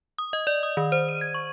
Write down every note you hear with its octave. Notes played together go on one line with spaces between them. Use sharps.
D#6
D#5
D5
D#6
D#3
C5
D#7
G#6
C#6